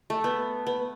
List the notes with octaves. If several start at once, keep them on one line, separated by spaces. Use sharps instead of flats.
A3
B3
B3